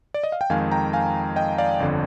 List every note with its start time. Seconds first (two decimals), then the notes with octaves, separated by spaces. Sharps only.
0.14 D5
0.24 D#5
0.32 F5
0.41 G5
0.50 F2 D#3 G#3 F5 G#5
0.71 G5 A#5
0.93 F5 G#5
1.36 D#5 G5
1.58 D5 F5
1.80 G1 F2 D3